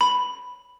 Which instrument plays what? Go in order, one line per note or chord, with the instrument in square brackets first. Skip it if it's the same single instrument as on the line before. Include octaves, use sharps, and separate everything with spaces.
[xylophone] B5